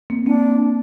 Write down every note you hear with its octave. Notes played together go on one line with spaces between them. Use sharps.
A#3 C4
A#3 C4 D4